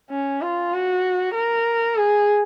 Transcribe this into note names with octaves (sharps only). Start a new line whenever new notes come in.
C#4
F4
F#4
A#4
G#4